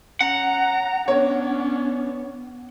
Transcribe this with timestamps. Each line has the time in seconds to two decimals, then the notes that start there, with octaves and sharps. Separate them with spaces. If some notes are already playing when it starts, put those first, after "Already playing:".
0.21 C#4 F#5 A#5
1.08 B3 C#4 D4 C#5